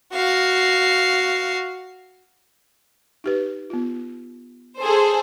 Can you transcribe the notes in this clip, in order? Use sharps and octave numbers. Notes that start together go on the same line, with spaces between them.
F#4 F5
D#4 G4 B4
B3 F4
G#4 A4 C5